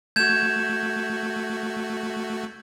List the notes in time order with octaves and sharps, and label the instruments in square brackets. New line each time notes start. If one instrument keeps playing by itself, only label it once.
[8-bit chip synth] A3 F#4 [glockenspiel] G6 G#6 E7